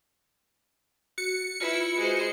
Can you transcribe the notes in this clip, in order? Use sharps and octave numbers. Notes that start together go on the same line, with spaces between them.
F#4 C#7
E4 F4 B4
G#3 F#4 C5